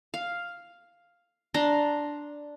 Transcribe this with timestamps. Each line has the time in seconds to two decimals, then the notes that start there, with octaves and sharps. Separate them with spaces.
0.14 F5
1.54 D4 A#5 C6